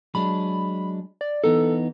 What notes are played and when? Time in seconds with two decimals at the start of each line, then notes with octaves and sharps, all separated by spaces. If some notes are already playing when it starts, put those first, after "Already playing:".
0.15 F#3 G#3 D4 B5
1.21 D5
1.44 E3 B3 D#4 A4